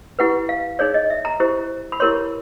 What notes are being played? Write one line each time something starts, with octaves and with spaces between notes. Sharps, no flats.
E4 G4 B4 F#5
F5
D#4 G#4 C#5 D5
D#5
E5
A#5
E4 G4 C5
B5
E4 G4 A#4 C#5 C6